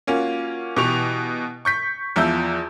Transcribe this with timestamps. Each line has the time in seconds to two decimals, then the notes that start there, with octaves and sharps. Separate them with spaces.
0.07 A#3 C#4 F4 F#4
0.76 B2 E3 G4 C#6 F7
1.65 C#6 G6 B6
2.16 E2 F3 E5 A#5 E6 G6